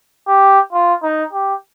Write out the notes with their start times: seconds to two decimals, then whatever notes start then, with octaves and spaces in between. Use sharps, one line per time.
0.28 G4
0.73 F4
1.03 D#4
1.33 G4